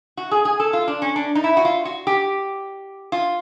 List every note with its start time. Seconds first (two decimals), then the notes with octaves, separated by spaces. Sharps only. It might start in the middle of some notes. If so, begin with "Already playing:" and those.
0.17 F#4
0.31 G#4
0.45 G#4
0.60 A4
0.73 F4
0.88 D4
1.02 C#4
1.16 D4
1.35 D#4
1.44 E4
1.57 F#4
1.65 F4
1.85 F#4
2.07 G4
3.12 F4